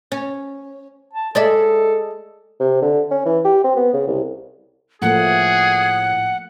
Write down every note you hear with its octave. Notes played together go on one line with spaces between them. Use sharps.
C#4
A5
G#3 A4 D5 E5
C3
D3
C#4
E3
G4
C4
B3
C#3
C2
A2 F3 A3 A#3 G#4 F#5